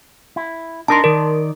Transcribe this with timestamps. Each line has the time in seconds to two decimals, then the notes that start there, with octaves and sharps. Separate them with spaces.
0.36 E4
0.88 D4 D#4 A#4 A5 C6
1.04 D#3 A#4 D5